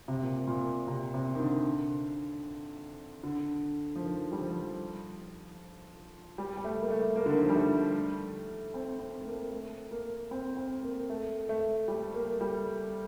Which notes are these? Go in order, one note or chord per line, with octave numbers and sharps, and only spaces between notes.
C3
A#2
A#2
C3
C3
D#3
D3
D3
F3
D#3
G3
F3
G3
G3
A3
A#3
A3
A#3
D3
D#3
F3
G3
A3
C4
C4
A3
A#3
A3
A#3
C4
C4
A#3
A3
A3
G3
A#3
G3